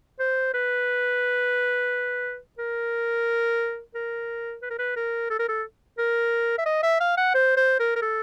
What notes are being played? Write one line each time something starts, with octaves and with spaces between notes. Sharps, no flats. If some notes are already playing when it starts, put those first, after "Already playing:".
C5
B4
A#4
A#4
B4
A#4
B4
A#4
A4
A#4
A4
A#4
E5
D#5
E5
F5
F#5
C5
C5
A#4
A#4
A4